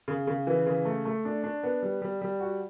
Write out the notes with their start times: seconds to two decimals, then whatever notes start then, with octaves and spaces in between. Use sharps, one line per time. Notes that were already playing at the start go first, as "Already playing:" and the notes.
0.08 C#3
0.27 C#3
0.47 E3
0.66 C#3
0.85 A3
1.05 A3
1.25 D4
1.44 D4
1.63 B3
1.83 G3
2.02 G3
2.22 G3
2.40 F#4